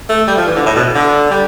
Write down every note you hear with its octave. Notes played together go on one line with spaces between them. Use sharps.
A3
G3
F3
E3
D3
A2
B2
D3
G3